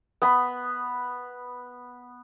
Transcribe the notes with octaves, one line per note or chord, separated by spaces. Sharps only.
B3 B5